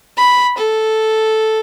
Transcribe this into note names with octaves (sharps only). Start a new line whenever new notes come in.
B5
A4